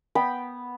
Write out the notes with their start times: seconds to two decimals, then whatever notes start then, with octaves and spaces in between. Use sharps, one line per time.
0.15 B3 G5 B5